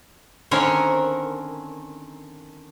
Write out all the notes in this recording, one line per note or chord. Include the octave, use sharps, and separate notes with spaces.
D3 D#3 C4 C#4 A#4 C#5